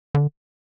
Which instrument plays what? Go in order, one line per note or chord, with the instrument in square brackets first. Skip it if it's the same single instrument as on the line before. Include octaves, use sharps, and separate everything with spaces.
[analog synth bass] D3